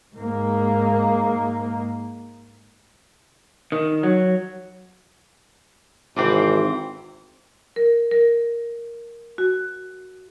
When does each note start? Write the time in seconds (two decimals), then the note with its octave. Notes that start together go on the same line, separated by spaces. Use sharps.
0.14 G#2 A#3
3.72 D#3
4.03 F#3
6.16 G#1 C3 E3 C4
7.76 A#4
8.11 A#4
9.38 F#4